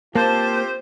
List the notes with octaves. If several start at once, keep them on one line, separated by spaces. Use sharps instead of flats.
A#3 C4 F4 G4 C5 A5